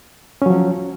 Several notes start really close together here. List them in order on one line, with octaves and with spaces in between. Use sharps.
C#4 F#3 F3